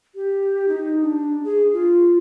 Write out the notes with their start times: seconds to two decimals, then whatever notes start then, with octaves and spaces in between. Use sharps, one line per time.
0.15 G4
0.68 D#4
1.02 D4
1.44 G#4
1.73 F4